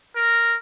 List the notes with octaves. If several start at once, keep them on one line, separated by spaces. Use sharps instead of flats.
A#4